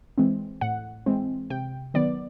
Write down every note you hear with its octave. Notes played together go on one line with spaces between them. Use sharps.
E3 G#3 C4
A2 F#5
E3 G#3 C4
C3 G5
D#3 F#3 B3 D5